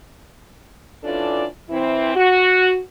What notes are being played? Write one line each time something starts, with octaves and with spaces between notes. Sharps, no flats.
E3 C#4 D4 F4 A4 D5
E3 C4 E4
F#4